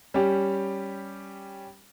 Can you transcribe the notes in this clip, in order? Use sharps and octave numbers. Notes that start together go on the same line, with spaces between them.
G3 C#4 G4